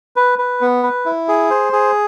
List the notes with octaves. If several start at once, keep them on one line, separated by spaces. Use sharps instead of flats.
B4
B4
B3
B4
E4
G#4
C5
G#4